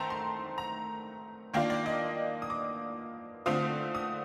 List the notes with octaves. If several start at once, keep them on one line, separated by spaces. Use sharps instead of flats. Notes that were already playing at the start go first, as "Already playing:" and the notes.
Already playing: D#3 A3 C4 G5 A5 A#5 C6
C6
A#5
D#3 A#3 D4 F4 G5
D5
D#5
D#6
D6
D3 A3 C4 F4 D#6
D#6